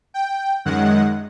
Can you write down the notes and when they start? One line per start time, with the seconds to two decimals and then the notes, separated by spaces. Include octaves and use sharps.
0.14 G5
0.65 F#2 D#3 G#3 F#5